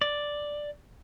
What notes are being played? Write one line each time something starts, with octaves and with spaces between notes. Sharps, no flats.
D5